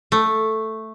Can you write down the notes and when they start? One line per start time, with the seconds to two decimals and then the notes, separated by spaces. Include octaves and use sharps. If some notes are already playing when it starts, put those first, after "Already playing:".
0.12 A3